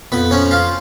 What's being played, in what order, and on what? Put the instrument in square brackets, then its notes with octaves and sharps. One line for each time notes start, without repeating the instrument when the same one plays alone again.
[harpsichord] F2 B3 B4
F3 C#4 C#5
F3 F4 F5